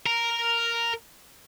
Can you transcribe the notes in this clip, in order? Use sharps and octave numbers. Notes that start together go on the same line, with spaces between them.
A#4